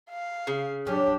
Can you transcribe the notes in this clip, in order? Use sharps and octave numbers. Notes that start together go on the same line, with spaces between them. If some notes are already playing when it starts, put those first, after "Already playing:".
F5
C#3
F#3 C#4 D4 G4